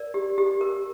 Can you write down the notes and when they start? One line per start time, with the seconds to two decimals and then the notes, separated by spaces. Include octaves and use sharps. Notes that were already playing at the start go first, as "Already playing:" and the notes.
Already playing: A#4 D5
0.14 G4
0.38 G4
0.61 A#4